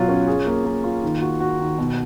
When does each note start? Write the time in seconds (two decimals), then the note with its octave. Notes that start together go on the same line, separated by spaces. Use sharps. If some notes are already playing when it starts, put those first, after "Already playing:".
Already playing: B2 F#3 F4
0.09 C#4
0.27 G#4
0.47 A#3
0.65 A#3
0.84 F4
1.03 D#3
1.22 F#4
1.40 F#4
1.59 D#3
1.78 B2